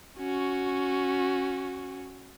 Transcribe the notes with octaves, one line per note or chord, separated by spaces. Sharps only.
C#4 F#4